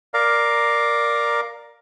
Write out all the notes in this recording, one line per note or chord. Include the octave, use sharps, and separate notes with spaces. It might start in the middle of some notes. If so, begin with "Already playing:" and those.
A#4 D5 F5 A#5